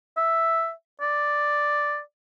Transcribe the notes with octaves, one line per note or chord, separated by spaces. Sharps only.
E5
D5